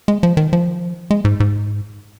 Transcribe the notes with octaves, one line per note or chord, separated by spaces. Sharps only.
G#3
F3
D#3
F3
G#3
G#2
G#2